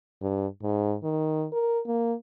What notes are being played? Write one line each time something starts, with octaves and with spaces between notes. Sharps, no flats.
G2
G#2
D#3
A#4
A#3